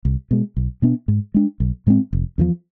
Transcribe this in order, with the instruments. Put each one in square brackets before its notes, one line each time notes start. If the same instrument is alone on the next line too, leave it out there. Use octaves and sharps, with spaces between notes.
[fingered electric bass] C2
B2 G#3
B1
B2 B3 D4
G#2
G#3 D4
B1
A2 G#3 C4
F1
E2 D3 F3